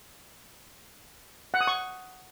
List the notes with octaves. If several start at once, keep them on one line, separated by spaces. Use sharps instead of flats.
F#5
D#6
C#6